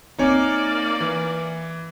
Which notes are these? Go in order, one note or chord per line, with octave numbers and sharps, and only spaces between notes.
A#3 C4 D#4 E4 C#5 D5 G#5
E3